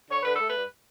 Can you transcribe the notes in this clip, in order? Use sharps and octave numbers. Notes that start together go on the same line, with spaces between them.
D3 C#5
D3 B4
A4
A3
B4
G2